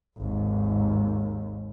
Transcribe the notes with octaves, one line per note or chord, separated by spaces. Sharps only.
G#1 D#2